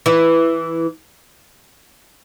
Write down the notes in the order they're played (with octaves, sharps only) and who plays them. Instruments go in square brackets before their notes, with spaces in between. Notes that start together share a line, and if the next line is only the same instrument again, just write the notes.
[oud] E3 E4